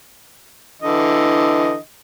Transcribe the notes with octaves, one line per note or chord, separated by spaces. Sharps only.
D3 E3 D#5